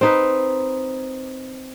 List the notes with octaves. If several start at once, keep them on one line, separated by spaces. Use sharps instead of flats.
C4 D#4 B4